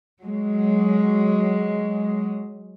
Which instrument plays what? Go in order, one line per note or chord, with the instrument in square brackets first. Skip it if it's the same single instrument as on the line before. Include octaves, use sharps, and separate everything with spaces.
[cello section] F#3 G#3